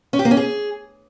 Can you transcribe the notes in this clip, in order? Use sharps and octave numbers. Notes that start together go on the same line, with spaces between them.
C#4
G4
A#3
C#4
G#4